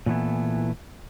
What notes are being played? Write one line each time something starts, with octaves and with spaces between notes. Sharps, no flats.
A#2 E3 A3 B3 E4